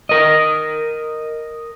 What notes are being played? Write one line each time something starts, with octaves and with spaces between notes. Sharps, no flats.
A#4 D#5